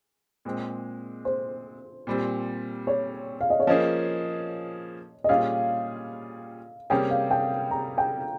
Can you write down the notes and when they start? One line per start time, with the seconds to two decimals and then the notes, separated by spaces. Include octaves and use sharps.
0.45 A#2 G#3 C4
1.25 C5
2.07 A#2 G3 C4
2.87 C#5
3.41 F5
3.50 D#5
3.60 C#5
3.67 F3 A#3 C#4 G#4 D#5
5.24 D#5
5.29 A#2 G3 C#4 F4 G#4 F5
6.90 C3 G3 A#3 C#4 G#4 G5
7.10 F5
7.31 G5
7.71 A#5
7.98 G5